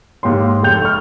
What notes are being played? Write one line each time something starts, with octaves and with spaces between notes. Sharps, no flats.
G#2 A#3 G4 C#5 C6
F1 G#3 A4 G5 G6 F7
C#6 F6